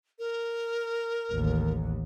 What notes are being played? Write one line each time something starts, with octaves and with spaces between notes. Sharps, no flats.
A#4
A1 D#2